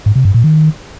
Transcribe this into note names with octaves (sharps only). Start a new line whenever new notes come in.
G#2
C3
G2
A#2
D#3